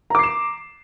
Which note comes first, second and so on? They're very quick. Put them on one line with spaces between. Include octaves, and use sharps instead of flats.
A#5 D6 C7 E7